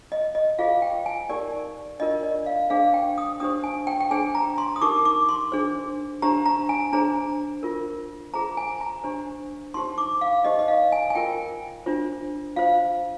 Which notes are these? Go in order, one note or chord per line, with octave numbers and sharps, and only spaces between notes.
D#5
D#5
F4 G#4 C5 F5
G5
G#5
D#4 G4 A#4 D5
D4 F4 A#4 D#5
D5
F5
D4 G#4 C5 F5
G5
D#6
D4 G4 C5 D#6
G#5
G5
G5
D4 G#4 C5 G#5
A#5
C6
D#6
D#4 G4 A#4 D6
D6
C6
D4 G#4 C5
D4 G4 C5 A#5
A#5
G#5
D4 G#4 C5 A#5
F4 A#4
F4 G#4 C5 A#5
G#5
A#5
D4 G4 C5
D#4 G4 C5 C6
D6
F5
D#4 G4 C5 D#5
D#5
F5
G#5
G#5
F4 A#4 G5
D4 F4 C5
F4 C5 F5